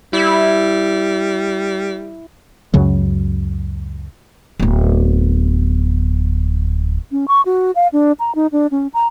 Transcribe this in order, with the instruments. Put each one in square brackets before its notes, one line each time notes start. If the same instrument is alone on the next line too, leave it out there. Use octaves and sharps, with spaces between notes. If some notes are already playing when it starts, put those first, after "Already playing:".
[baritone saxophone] G3 [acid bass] E4
[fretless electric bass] C#2 F#2 C#3 F#3
[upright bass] D1 B3
[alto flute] C#4
C#6
F#4
F5
D4
A#5
D#4
D4
C#4
A#5